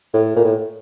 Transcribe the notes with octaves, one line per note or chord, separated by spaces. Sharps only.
A2
A#2
A2